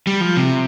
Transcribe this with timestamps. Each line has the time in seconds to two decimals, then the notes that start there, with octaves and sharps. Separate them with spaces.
0.07 G3
0.21 F3
0.37 C3